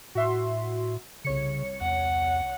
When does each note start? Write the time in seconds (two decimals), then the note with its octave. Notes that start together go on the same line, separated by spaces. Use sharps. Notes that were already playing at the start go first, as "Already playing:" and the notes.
0.15 A2 F#4 E5 C6
1.24 C2 C#3 C#5 C#7
1.81 E2 F#5